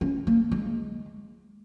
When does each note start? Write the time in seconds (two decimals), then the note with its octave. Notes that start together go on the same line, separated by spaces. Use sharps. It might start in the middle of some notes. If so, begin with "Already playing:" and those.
0.01 C#4
0.27 A#3
0.52 G#3